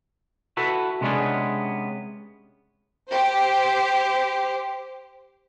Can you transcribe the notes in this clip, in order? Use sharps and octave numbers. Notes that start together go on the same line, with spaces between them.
E4 F#4 A4 B4
C3 G#3 B3 C#4 D4 G#4
G4 C5